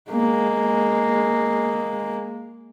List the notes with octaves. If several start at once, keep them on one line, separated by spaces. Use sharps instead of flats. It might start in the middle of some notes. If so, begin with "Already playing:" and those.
G#3 A#3